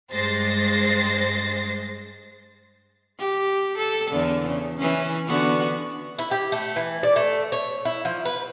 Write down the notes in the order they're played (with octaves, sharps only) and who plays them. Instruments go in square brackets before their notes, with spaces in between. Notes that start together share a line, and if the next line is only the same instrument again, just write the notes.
[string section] G2 G#3 C5 A6 A#6 C7
[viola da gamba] G4
A4
E2 D3
C#3
E3 C#4
D3 B3 F#4
[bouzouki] E4
G4
A3
E3
D5
A3
C#5
E4
F3
B4